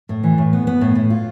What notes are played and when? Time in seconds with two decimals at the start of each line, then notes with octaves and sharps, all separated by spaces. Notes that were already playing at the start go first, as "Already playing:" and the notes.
0.09 A2
0.23 E3
0.38 A2
0.53 B3
0.67 B3
0.81 A2
0.95 A2
1.10 F4